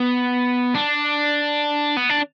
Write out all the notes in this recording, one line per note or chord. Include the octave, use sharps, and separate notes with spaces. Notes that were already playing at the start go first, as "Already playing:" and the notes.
Already playing: B3
D4
B3
D4